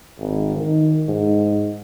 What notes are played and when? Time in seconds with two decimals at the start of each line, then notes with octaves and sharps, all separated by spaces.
0.19 G#1
0.56 D#3
1.08 G#2